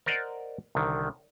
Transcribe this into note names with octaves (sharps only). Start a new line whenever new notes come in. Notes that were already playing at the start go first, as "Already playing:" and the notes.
A#4 C5 D5 D#5 F#5
C2 D3 D#3